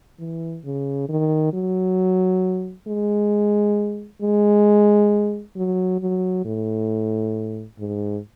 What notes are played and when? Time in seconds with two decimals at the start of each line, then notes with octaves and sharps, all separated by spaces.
0.19 E3
0.65 C#3
1.09 D#3
1.53 F#3
2.88 G#3
4.22 G#3
5.56 F#3
6.01 F#3
6.45 A2
7.79 G#2